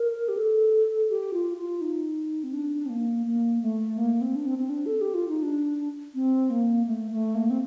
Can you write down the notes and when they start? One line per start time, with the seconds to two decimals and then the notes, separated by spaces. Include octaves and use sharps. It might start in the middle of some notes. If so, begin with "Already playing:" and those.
Already playing: A#4
0.28 G4
0.37 A4
1.10 G4
1.33 F4
1.58 F4
1.81 D#4
2.43 C4
2.54 D4
2.86 C4
2.90 A#3
3.27 A#3
3.62 A3
3.98 A#3
4.21 C4
4.35 D4
4.46 C4
4.58 C4
4.70 D4
4.86 A4
5.01 G4
5.14 F4
5.28 D#4
5.43 D4
6.15 C4
6.50 A#3
6.87 A3
7.11 A3
7.35 A#3
7.50 C4